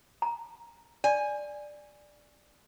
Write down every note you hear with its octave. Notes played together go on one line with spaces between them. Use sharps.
A#5
D5 G#5